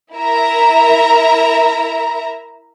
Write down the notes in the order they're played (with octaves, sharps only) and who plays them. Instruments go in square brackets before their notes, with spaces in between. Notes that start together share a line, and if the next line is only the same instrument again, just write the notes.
[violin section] E4 A#4 E5 A#5